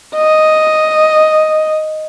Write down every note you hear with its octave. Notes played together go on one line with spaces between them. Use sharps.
D#5